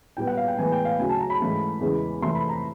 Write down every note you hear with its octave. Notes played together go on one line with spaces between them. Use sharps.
A#2 G3 B3 G5
F#5
F5
G5
A2 E3 G#3 B3 G#5
G5
F5
D2 C#3 F#3 A3 G#5
A5
A#5
B5
G#2 E3 A3 C#4
E2 C#3 E3 G#3
F2 C3 E3 A3 C6
B5
A#5